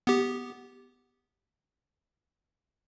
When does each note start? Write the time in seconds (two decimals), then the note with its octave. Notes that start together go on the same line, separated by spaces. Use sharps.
0.07 B3 G4